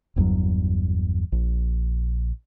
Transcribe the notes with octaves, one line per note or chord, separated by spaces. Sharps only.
G1 E2 G2 F#3
A#1